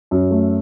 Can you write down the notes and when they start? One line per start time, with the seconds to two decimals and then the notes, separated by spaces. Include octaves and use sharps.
0.11 F#2
0.31 A3